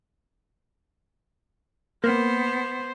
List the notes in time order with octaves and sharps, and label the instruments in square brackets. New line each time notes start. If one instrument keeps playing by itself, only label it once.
[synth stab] A#3 [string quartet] B3 [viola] C5